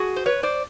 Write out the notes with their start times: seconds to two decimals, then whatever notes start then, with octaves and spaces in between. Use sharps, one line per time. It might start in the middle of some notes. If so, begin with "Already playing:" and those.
Already playing: F#4 G#4
0.16 C5
0.26 B4 C#5
0.43 C5 D5